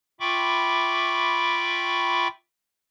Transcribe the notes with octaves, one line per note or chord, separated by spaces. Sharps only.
F4 E5 G5 B5 C#6 D6